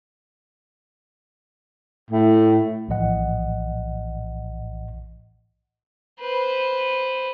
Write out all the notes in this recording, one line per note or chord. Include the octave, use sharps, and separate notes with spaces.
A2
A#1 A2 E3 D#5 F#5
B4 C5